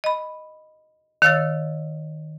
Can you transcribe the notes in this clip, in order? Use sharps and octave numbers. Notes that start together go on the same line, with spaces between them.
D#5 B5
D#3 C#5 F5 E6 F6 A6